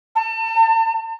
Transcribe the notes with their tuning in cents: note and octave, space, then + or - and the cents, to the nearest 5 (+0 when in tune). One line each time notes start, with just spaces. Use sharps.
A5 +35